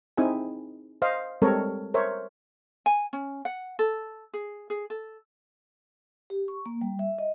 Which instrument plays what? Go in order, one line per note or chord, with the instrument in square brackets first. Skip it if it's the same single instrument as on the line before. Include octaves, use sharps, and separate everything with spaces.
[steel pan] C4 D#4 E4 G#4 G#5
C5 D#5 F5
G3 G#3 C4 A4 A#4 C#5
A#4 C5 C#5 E5
[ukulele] G#5
C#4
F#5
A4
G#4
G#4
A4
[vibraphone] G4
C#6
A#3
G3
E5
D#5